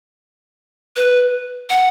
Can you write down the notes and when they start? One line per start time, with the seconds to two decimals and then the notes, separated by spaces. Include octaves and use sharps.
0.96 B4
1.70 F#5